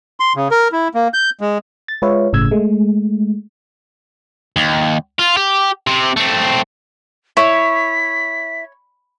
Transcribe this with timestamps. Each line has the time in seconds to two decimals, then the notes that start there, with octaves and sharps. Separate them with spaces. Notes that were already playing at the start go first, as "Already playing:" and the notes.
0.20 C6
0.35 C#3
0.51 A#4
0.72 E4
0.94 A#3
1.14 G6
1.41 G#3
1.88 A6
2.02 G#3 F4 B4 C#5 E5 F5
2.33 G1 A2 C#3 E6 G#6
2.51 G#3 A3
4.56 D#2
5.19 F4
5.37 G4
5.87 C3 C4
6.17 A3 C4
7.37 E4 C#5 B6